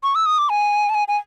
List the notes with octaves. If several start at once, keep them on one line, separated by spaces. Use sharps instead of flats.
C#6
E6
D#6
D6
G#5
A5
G#5
G#5